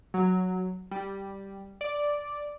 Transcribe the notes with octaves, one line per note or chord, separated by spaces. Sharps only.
F#3
G3
D5